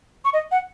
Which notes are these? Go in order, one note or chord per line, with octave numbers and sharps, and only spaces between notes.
C#6
D#5
F#5